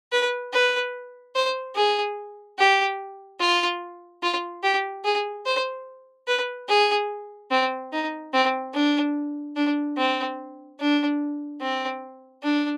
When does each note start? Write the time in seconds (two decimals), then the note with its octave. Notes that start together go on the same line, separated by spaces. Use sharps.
0.12 B4
0.54 B4
1.35 C5
1.76 G#4
2.59 G4
3.40 F4
4.23 F4
4.63 G4
5.04 G#4
5.46 C5
6.27 B4
6.69 G#4
7.51 C4
7.92 D#4
8.33 C4
8.74 D4
9.56 D4
9.98 C4
10.80 D4
11.61 C4
12.43 D4